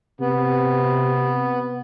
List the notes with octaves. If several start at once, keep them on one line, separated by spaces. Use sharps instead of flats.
C3 B3